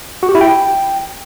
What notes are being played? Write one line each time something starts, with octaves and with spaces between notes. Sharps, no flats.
F#4
G4
E4
G5